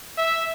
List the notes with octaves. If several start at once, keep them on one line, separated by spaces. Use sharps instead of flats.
E5